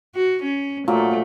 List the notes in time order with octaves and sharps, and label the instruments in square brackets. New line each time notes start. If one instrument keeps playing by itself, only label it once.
[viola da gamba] F#4
C#4
[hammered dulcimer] A#2 F3 F#3 [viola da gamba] A3